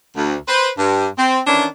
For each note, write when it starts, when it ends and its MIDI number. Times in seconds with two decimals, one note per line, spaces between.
0.16 0.36 38
0.48 0.69 71
0.48 0.69 72
0.78 1.07 43
1.18 1.39 60
1.47 1.65 51
1.47 1.65 52
1.47 1.65 61
1.47 1.65 62